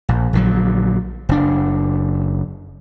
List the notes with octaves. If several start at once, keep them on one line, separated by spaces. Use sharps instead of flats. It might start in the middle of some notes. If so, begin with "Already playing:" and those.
A#1
A#1 D3 F#3
F#1 D4